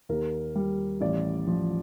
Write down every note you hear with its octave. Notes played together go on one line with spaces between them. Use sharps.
D#2 A#4
G3
A1 D5
F3